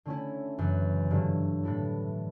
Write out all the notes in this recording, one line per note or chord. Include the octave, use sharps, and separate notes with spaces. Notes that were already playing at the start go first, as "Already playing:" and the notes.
D3 A3 C#4 E4
F#2 C#3 E3
G2 D3 F#3
A2 E3 B3 E4 A4